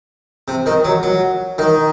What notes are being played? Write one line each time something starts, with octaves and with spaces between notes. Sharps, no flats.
C3
D#3
F#3
F#3
D#3